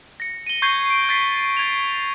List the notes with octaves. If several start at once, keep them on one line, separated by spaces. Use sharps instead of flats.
A#6 C#7
D#7 G7
C#6 G6 G#6 C7 G7
D7
G6 A6 B6 C7
G#6 F7